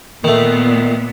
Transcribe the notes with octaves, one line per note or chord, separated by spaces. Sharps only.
A#2 D#3 A3 B3